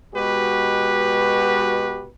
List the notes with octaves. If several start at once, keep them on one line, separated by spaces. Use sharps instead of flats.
B2 G#3 F#4 G4 B4